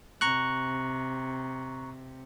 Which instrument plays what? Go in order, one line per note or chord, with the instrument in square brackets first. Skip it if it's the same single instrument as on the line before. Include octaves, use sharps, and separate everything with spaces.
[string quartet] C3 [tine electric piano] A#5 C#6 F#6